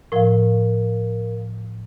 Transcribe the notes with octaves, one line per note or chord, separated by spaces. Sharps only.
A2 F3 A#4 F5